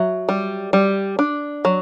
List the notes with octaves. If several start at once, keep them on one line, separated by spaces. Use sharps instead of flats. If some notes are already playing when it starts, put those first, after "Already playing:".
Already playing: F#3 E5
G3
G3
D4
F#3